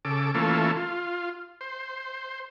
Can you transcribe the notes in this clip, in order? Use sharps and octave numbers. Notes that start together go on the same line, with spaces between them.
C#3 A4 D6
E3 A3 A#3 C#4 F4 A4
F4
C5